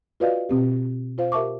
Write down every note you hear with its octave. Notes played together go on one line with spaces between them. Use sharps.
F4 F#4 B4 D5 D#5 F5
B2 C4 G4
F4 C5 F5
G4 A#4 E5 A5 C#6 D6